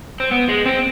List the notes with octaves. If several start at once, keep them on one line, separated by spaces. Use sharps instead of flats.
C4
B3
G#3
C4